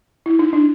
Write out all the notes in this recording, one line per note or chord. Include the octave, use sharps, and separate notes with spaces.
E4
D#4
D4